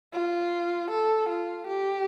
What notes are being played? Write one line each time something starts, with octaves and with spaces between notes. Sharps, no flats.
F4
A4
F4
G4